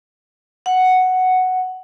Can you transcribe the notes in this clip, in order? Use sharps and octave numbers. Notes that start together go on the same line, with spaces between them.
F#5